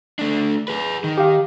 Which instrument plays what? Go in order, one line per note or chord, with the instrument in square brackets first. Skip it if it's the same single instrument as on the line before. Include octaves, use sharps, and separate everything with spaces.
[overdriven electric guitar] A3 D4
G#4 B4
D#3
[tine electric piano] G4 F5